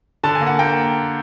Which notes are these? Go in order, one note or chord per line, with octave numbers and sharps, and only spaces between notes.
D3 A5
G#5
A#3
F#5
A#3 G5